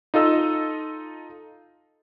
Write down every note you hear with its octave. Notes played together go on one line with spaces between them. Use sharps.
D#4 F4 A4 D#5 E6